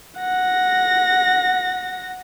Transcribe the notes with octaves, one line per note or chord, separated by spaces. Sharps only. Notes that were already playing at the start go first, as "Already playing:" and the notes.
F#5 A#6